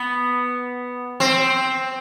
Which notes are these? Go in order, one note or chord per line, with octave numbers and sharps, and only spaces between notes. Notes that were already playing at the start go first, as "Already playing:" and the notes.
Already playing: B3
C4